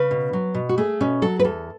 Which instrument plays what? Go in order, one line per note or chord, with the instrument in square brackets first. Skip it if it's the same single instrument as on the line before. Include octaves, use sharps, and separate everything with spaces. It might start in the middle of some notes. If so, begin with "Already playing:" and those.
Already playing: [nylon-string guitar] C#3 B4
B2
F#3
B2
F#4
A3 G#4
B2 C#4
F#3 A4
B4
E2 A4